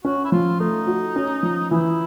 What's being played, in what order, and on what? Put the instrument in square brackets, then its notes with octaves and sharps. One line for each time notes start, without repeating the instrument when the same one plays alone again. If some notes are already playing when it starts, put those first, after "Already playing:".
[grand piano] C#4 [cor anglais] F#4
[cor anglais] E4
[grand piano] F3 [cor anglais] F4
[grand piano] A3 [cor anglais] D#4
[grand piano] F#4
C#4
F3
[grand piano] E3 [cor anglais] E4